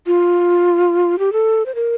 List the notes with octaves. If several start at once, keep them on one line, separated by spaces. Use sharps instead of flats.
F4
G4
A4
C5
A#4